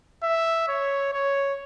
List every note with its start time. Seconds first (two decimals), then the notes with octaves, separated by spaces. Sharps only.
0.23 E5
0.68 C#5
1.13 C#5